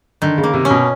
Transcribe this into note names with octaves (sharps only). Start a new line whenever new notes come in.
D3 D#3
C#3
A#3
C3
C#4
B2